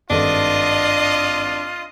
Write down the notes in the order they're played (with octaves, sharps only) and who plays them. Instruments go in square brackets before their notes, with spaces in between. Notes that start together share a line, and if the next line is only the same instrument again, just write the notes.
[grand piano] G#1 G2 A4 [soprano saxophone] D4 [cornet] F4 [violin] D#5 D#6